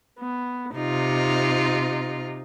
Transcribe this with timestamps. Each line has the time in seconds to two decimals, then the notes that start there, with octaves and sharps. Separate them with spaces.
0.19 B3
0.74 C3 D#4 F4